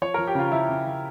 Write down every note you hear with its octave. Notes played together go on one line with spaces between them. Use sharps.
F3 C#5
F3 A#4
G4
C#3 F4
F3 E4
C#3
F3